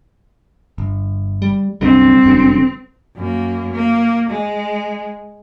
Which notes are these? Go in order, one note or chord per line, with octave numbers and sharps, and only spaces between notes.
G1
G3
C2 F#2 D3 G3 C4
F1 F#2 D3
F#2 A#3
A#3
G#3